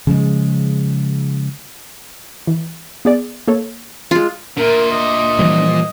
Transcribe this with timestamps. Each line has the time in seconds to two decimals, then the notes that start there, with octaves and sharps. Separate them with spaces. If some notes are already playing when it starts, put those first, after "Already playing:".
0.07 C#3 F3 G#3
2.47 E3
3.05 B3 G#4 D5
3.48 A#3 A4 C#5
4.11 G#3 F4
4.57 A#2 D4 A#4 E5
4.92 D#5
5.39 E3 F3 G3